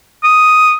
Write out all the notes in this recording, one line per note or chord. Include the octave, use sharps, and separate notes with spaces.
D#6